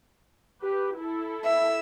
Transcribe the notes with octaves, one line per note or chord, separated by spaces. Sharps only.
G4 B4
E4 A4
E5